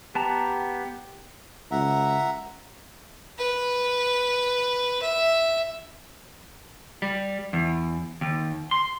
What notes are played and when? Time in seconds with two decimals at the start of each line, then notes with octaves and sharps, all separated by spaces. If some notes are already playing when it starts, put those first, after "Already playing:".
0.15 B3 G4 A5 A#5
1.71 C#2 E5 F#5 A#5
3.38 B4
5.03 E5
7.02 G3
7.53 E2
8.21 D#2
8.71 C6